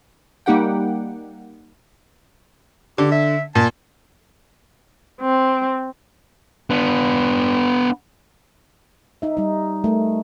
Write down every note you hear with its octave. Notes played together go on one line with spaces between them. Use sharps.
G3 A#3 D#4 G4 F#5 G5
D3 G4
E5
A#2 A5
C4
B3 D4
D#4 E5
G3 D#4
A3 A#4